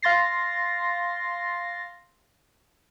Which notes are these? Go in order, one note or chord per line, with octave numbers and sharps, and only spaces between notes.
F5 C6 A6 A#6 C7